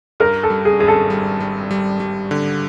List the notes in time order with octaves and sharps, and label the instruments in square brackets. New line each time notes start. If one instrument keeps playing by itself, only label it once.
[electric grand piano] G2 [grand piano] A#4
[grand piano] A4
[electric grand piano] G3
[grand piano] G#4
[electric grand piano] G#1 [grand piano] G#4
[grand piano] A4
[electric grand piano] G3
G3
G3
G3
D3